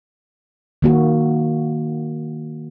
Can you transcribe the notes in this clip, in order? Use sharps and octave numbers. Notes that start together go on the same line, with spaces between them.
D#3 A#3 F#4